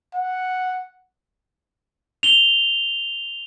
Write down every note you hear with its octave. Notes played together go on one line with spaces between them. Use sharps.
F#5
F7 G7